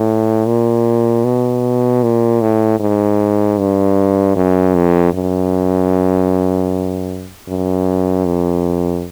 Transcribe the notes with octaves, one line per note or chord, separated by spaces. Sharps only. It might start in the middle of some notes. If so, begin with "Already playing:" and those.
Already playing: A2
A#2
B2
A#2
A2
G#2
G2
F#2
F2
F#2
F#2
F2